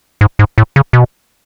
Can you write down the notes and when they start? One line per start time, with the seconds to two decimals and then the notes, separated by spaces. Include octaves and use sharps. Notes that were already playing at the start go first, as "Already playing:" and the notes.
0.21 G#2
0.39 G#2
0.58 A2
0.76 C#3
0.93 B2